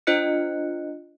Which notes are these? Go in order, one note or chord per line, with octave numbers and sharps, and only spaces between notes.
D4 F4 C5 D#5 F#6 C#7